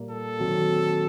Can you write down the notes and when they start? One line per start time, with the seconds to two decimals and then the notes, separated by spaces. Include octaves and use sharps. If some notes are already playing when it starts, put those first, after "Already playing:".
Already playing: A#2 G3 A#3
0.11 A4
0.39 D#3 F#3 C4 F#4